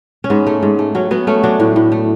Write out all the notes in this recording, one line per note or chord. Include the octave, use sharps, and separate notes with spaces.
C#4
G#2 B3
A3
G#2
A3
F#3 C#4
F#3 B3
A3 C#4
F#3 D4
A2
A2
A3